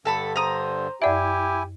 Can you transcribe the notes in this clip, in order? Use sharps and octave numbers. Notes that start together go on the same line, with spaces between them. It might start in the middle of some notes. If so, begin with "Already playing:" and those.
G2 D3 A4 A5 B5
C5 A#5 D#6
F#2 E4 G4 D5 E5 G#5